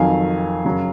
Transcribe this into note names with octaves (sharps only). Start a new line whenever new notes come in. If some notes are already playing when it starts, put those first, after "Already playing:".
Already playing: F2 D#3 F#3 F5 G#5
F#2 C#3 F#3